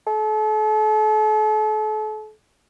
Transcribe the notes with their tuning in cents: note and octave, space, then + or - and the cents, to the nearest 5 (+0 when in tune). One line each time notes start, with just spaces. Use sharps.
A4 -40